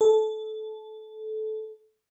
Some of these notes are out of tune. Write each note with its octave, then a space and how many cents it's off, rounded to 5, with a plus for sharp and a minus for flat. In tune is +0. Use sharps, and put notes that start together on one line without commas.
A4 -20